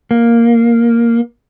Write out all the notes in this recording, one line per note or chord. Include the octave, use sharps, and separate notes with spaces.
A#3